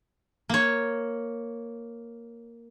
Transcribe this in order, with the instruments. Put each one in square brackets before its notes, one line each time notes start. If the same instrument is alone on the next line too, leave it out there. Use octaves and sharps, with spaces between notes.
[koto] A#3 C#5